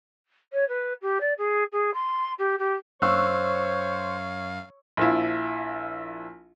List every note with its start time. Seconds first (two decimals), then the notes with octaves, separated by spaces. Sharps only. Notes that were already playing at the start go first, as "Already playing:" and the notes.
0.53 C#5
0.68 B4
1.02 G4
1.20 D5
1.38 G#4
1.72 G#4
1.94 C6
2.38 G4
2.59 G4
3.02 F#2 C5 C#5 F5 C#6 E6 F#6
4.97 A#1 F3 E4